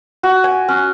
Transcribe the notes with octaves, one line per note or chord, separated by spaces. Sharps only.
F#4
G#5
C#4